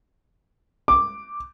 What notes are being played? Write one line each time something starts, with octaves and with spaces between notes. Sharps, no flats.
D6